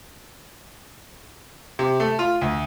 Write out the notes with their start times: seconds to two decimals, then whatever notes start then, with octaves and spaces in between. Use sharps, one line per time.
1.79 C3
2.00 A3
2.19 F4
2.41 D2